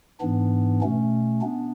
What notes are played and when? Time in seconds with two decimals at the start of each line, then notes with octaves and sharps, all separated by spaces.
0.20 G#2 E3 B3 D4
0.81 B2 A3 C#4
1.41 B3 D4